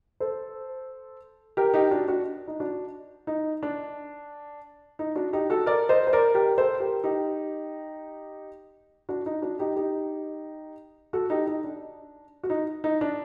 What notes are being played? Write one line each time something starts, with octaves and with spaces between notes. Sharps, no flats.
A4 C5
G4 A#4
D#4 G4
D4 F#4
D4 F#4
D#4
D4 F#4
D#4
D4
D#4
D4 F#4
D#4 G4
F#4 A4
A#4 D5
C5 D#5
C5
A#4 D5
G4 A#4
A4 C5
G4 A#4
D#4 G4
D4 F#4
D#4
D4 F#4
D#4 G4
D#4 G4
F#4 A4
D#4 G4
D#4
D4
F#4
D#4
D#4
D4